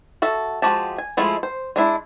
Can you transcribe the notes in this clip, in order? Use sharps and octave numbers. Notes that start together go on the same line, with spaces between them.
F#4 A4 E5
F3 G#3 F#4 G4 A5
G#5
F3 G#3 A3 E4 F4
C5
G#3 D4 E4